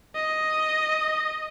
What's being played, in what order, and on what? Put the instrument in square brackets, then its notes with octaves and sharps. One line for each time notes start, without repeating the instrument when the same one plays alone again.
[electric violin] D#5